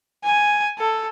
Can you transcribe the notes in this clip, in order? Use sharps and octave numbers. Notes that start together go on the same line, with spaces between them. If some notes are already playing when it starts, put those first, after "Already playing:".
G#5
A4